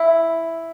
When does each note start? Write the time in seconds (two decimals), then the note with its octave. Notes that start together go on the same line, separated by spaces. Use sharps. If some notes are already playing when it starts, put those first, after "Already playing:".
Already playing: E4